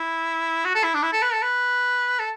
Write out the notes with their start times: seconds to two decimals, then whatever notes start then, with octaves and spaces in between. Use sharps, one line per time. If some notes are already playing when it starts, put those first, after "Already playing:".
Already playing: E4
0.65 F#4
0.75 A4
0.84 E4
0.94 D4
1.03 E4
1.13 A4
1.22 B4
1.33 A4
1.42 B4
2.19 A4